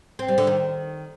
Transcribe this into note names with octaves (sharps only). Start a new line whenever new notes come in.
C4
G3
D3
D#3